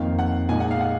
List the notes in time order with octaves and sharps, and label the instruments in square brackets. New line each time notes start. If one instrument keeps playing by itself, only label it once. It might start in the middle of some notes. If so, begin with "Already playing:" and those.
Already playing: [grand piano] F2 D#3 A#3 [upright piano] F5
[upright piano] F#5
[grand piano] A#2 G#3 D#4 G#4 [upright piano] G#5
[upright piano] F#5
F5
F#5